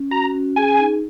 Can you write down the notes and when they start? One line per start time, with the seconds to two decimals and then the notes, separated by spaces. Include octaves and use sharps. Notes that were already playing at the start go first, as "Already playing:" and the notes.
Already playing: C#4
0.11 F#4 A#5
0.34 C#4
0.56 G#4 G#5
0.79 D#4